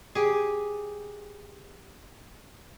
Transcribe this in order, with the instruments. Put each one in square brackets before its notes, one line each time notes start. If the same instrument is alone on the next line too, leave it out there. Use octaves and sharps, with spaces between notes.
[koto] G4 G#4